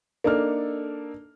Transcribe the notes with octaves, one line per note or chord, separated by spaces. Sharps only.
A#3 D4 D#4 A4 F6